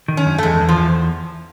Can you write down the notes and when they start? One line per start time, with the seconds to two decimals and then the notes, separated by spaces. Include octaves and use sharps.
0.08 D#3
0.17 C#4
0.26 F#2
0.38 A3
0.43 E2 G#3
0.61 E2
0.69 F3
0.78 E2